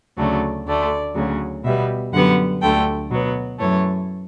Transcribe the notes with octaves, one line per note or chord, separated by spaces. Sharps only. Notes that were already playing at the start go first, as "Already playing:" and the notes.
D2 C#3 F#3 A3 D5
D2 D3 A3 D5
D2 C#3 F#3
B2 G3 B3 E5
F#2 D3 G3 B3 F#5
D2 D3 A3 G5
B2 F#3 B3
F#2 E3 A3 C#5